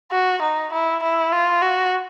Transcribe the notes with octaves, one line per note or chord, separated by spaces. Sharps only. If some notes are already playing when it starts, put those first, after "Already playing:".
F#4
D#4
E4
E4
F4
F#4